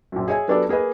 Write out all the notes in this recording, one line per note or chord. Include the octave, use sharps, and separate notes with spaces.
A#1 F#2
G#4 C#5 D#5 E5 G#5
F#3 B3 D4 G4 A4 D5
A#3 G#4 B4 D#5